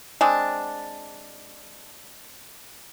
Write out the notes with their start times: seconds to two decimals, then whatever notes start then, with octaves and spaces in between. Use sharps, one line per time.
0.21 G#3 C4 D4